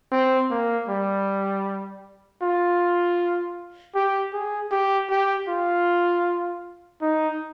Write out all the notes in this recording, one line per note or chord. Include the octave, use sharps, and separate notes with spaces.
C4
A#3
G3
F4
G4
G#4
G4
G4
F4
D#4